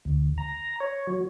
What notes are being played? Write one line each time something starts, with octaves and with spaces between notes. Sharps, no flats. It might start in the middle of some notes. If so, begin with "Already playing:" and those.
D2
A#5
C#5
F#3